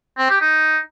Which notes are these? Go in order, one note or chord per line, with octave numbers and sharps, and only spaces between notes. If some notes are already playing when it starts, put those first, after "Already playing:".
C4
G4
D#4